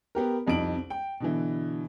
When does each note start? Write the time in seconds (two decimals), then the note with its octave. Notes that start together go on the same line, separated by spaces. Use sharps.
0.15 B3 G4 A#4
0.47 C2 F2 D#4 D7 F#7
0.90 G5
1.20 B2 D3 E3